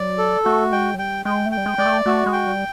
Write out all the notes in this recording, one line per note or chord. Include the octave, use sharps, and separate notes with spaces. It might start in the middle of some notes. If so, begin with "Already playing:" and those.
Already playing: F#3 D5
A4
A3 F#4
G#3 G5
F#3
G3 G5
G#3 G5
A3
G5
G3
G#3
G#3 D5
A3
A3 F#4
G#3
G5
G3